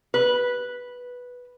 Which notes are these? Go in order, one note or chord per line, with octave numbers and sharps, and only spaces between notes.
B4